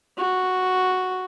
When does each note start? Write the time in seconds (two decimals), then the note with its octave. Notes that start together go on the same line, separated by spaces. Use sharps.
0.17 F#4